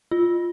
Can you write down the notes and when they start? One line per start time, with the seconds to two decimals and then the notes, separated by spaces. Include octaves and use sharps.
0.11 F4